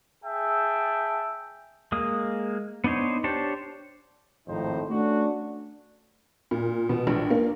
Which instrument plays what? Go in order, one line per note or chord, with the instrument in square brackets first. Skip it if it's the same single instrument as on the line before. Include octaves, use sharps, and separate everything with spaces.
[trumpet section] G#4 E5 G5 A5
[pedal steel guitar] G#3 A#3 D#6
B3 D4 D#4 C5 C#5
D4 G4 C5 C#5 A5
[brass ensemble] G#1 F2 A2 D#4 C5
A3 C#4 D4 F#4
[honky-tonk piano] A#2
B2
A#1
A#3